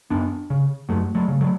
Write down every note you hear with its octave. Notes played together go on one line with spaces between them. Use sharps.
F#2 B3 D4
C#3
F#2 F#3 A3
F#3 A3
C#3
F#3 A3